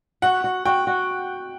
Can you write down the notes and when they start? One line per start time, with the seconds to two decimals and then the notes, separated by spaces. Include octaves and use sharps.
0.22 F#4 F#5
0.44 F#4
0.65 F#4 G5
0.87 F#4